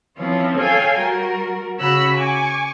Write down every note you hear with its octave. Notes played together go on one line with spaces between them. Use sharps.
E3 F3 C4 C#4 F4 C#5
A4 C#5 F5 G5 G#5 G#6
G3 F#4 A#4
C#3 F#4 C#5 B5 E6 F#6
G#5 C#6 D6